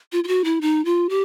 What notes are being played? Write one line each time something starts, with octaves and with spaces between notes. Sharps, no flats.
F4
F4
F#4
E4
D#4
F4
G4